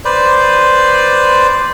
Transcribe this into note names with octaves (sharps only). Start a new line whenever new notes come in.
B4 C5 D5